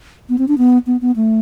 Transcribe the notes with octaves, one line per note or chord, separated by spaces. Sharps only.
B3
C4
D4
B3
B3
B3
A3